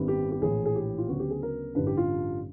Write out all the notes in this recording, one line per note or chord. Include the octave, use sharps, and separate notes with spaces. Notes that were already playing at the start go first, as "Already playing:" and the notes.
Already playing: G#1 F#2 D#3 G3 B3
G4
G4
A#1 A2 E3 G#4
G#4
G4
F4
D2 C#3 F#3 B3 F#4
G4
G#4
A#4
A1 G2 D3 B4
G4
F4